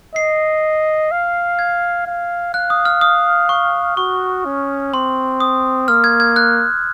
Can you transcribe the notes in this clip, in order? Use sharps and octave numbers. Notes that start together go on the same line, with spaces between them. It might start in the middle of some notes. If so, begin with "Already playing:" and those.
D#5 C7
F5
G#6
F5
F5 F#6
D#6
F6
D#6
C#6
F#4 C#6
C#4
C4 C6
D#6
A#3 F6
G#6
G#6
F#6